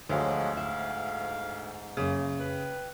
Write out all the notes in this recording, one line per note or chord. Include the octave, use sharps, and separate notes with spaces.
D2 F3 F#3 G#3 C#5 F5
G#2 E5 F5
F#2 C#3 A#3
B4 G5